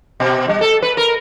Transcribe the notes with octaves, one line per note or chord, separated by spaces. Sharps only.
B2
G3
A4
B4
A#4